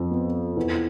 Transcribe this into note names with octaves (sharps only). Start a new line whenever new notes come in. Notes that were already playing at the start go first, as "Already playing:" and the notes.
Already playing: F2
B3
E2